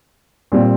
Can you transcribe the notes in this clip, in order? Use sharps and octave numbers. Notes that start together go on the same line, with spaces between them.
A#2 G3 C4